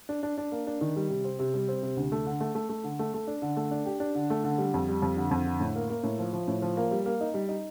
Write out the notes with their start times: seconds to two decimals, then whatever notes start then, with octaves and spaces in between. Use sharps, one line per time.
0.09 D4
0.23 D4
0.38 D4
0.52 A#3
0.67 D4
0.81 D#3
0.96 G3
1.10 C3
1.24 C4
1.39 C3
1.54 G3
1.68 C4
1.83 C3
1.97 D2
2.12 A3
2.26 D3
2.40 A3
2.55 A3
2.69 A3
2.84 D3
2.99 A3
3.14 A3
3.27 D4
3.42 D3
3.57 A3
3.71 D4
3.86 G4
4.00 D4
4.15 D3
4.30 A3
4.44 D3
4.58 G3
4.74 F2
4.88 G3
5.02 F2
5.17 D3
5.31 F2
5.46 D3
5.60 A2
5.75 A#3
5.90 A#3
6.03 A2
6.19 F3
6.33 F3
6.48 A2
6.62 F3
6.77 A#3
6.91 G3
7.06 A#3
7.21 D#4
7.34 G3
7.49 D#4